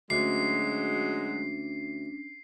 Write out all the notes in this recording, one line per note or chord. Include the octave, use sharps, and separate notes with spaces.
D2 F#3 G#3 C#4 D4 C7